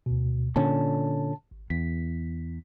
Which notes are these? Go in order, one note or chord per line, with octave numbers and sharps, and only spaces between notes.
D2 B2
A#2 D3 C#4 A5
G#1
E2 B6